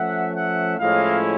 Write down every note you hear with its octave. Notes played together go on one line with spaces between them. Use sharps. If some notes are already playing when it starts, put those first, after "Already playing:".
Already playing: F3 A3 C#4 E5 F#5
E5 F#5
A2 F3 G#3 C#4 E4 D#5 F5